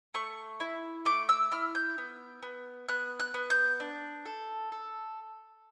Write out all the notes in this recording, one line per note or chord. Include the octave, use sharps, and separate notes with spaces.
A3 C#6
E4
A3 D6
E6
E4 F6
G6
B3
B3
B3 F#6
F#6
B3
G6
D4
A4
A4